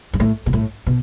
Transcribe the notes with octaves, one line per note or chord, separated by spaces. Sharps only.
G2
A2
B2
A2
B2